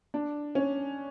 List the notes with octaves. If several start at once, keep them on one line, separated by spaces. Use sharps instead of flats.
D4
C#4